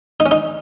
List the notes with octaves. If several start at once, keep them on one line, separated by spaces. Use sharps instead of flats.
D#4
C#4
D#4